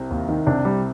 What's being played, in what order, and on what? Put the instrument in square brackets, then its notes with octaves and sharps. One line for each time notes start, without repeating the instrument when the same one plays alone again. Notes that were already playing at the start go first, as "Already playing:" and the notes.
Already playing: [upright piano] C2 C3
[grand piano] D#2
D#3
[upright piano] C2 C3 [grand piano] D4
[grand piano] G3